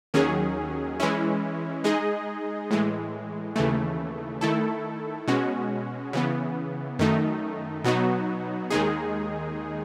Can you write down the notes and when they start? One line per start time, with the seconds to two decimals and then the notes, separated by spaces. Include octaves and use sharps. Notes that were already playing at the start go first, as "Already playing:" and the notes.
0.14 D#2 D#3 F#3 C#4 G#4
1.00 E3 G#3 C#4 E4
1.84 G#3 D#4 G#4 D#5
2.71 A2 E3 G#3
3.56 D#2 C#3 E3 A3
4.41 D#3 A3 E4 A4
5.28 B2 G#3 C#4 F#4
6.13 C#3 E3 B3
6.99 F#2 D#3 A3 D#4
7.84 B2 F#3 B3 D#4 F#4
8.71 D#2 D#3 G#3 D#4 G#4